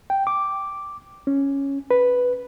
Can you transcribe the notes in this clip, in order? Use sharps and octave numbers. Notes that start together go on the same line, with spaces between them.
G5
D6
C#4
B4